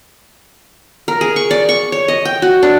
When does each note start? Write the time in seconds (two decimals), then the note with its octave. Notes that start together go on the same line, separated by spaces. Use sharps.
1.08 A#4
1.21 G#4
1.36 C#6
1.51 D5
1.69 C#6
1.92 C#5
2.08 D#5
2.25 G5
2.42 F#4
2.63 D4